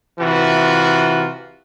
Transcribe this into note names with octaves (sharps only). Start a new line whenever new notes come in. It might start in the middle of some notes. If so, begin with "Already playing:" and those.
C3 E3 F4 F#4